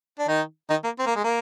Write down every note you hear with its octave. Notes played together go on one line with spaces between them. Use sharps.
D4
D#3 D#4
D#3 D#4
A#3
C4
A#3
G#3
A#3